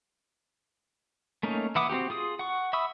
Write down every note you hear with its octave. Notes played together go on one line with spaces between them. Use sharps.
A3 A#3 C#4 D#4
E3 E4 F#5 D6 D#6
C4 D#4 F#4 G4
F4 G#4 D#6
F#5 C#6
E5 B5 C#6 D#6 E6